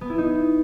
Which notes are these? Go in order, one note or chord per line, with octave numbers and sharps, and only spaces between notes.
B3
E4
D#4